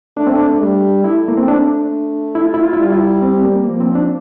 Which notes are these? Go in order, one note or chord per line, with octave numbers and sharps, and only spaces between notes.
A3 D4
C4
D4
G3
A3 E4
A#3
C4
D4
E4
F4
E4
F4
E4
G3 F4
E4
C4
A#3
F3 A#3
C4
D4